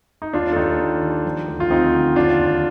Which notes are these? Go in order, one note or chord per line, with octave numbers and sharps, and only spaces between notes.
D#4
D#2 D4 F4
A4
D#2 D#4 G4
D#3
D#3
F3
D2
F4
D2 C4 D#4
D3
D#2 D4 F4
D#2